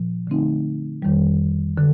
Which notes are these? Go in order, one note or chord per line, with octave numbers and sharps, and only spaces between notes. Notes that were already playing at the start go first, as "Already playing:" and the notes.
Already playing: A#2 F3
D3 A3 C4 D#4
F2 D#3 G3
D3